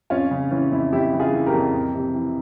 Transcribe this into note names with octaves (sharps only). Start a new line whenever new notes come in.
F2 C#4 F4
C#3
E3 C#4
F2 E4
F2 E4 G4
C#3
F4 G#4
E3
G4 A#4
F2
F2
C3
E3